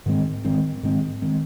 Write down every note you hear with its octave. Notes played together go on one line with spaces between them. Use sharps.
G#2 D#3 G#3 C4
G#2 D#3 G#3 C4
G#2 D#3 G#3 C4
D#3 G#3 C4